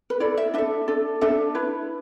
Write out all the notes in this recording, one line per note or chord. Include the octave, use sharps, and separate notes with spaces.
B4
E4 A4 D5
E5
D4 A4 E5
D4 A4
D4 A4 E5
E4 B4